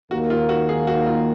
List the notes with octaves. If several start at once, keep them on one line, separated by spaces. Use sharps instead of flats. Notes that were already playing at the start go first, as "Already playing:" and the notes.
D#2 D#3 A#3 F#4
F4
F#4
G#4
F#4
F4